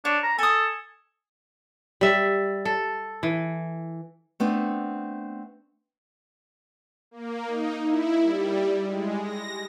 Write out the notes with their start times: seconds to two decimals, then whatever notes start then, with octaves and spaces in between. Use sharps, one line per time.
0.05 D4 C#5
0.23 A#5
0.38 A4 G#5 D#6
2.01 G3 E5
2.65 A4
3.23 E3
4.40 A3 B3 C4 D4
7.11 A#3
7.47 D#4
7.85 E4
8.23 G3
8.86 G#3
9.22 A#6